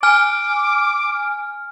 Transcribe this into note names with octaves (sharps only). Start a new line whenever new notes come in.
G#5 D6 F6